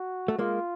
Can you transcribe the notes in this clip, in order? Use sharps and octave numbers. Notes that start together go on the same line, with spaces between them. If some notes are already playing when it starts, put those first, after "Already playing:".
Already playing: F#4
A3
G#3 A#3 F4